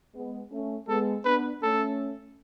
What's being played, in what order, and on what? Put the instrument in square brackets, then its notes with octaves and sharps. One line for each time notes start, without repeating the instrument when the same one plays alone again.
[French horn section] G#3 B3
A3 C#4
[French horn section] G#3 B3 [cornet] A4
[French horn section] B3 D4 [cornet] B4
[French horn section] A3 C#4 [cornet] A4